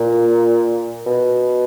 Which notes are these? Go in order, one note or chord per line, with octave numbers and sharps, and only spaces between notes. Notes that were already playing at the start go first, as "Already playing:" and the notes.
Already playing: A#2
B2